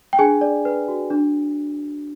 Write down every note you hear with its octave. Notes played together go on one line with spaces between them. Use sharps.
G5
D4 G#4 G#5
D5
B4
F#4
D4